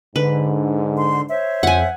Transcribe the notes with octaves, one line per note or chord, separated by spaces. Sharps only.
G#2 D3 B4
C6
C5 C#5 E5
F2 F#5 G#5